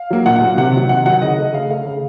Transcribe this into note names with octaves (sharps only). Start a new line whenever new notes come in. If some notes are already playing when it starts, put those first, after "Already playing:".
Already playing: F5
F#3 A#3
A#2 F#5
F#5
F#3 A#3
C3 F#5
D#3 F#3
C3 F#5
D#3 F#3 F#5
C#3 D#5
A3
C#3 F5
A3 F5
C#3